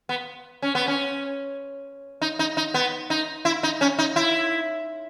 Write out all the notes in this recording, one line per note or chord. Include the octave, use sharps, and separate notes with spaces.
B3
C#4
B3
C#4
D#4
D#4
D#4
B3
D#4
E4
D#4
C#4
D#4
E4